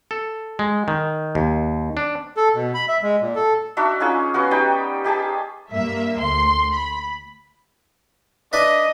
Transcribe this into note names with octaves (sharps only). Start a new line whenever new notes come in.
A4
G#3
D#3
D#2
D4
A4
B2
B5
E5
G#3
A#2
A4
D4 D#4 F#4 E5
C#4 D#4 F4 G#4
B3 C#4 F#4
G3 D#4 G5
D#4 G4 G#4 A5
G2 A#3 E5
D2 C6
B5
D4 B4 D#5 E5